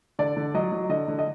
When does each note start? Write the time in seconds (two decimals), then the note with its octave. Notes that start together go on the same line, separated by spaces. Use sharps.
0.19 D3 D5
0.37 D3
0.54 F#3 D#5
0.72 F#3
0.89 D3 D#5
1.08 D3
1.19 D#5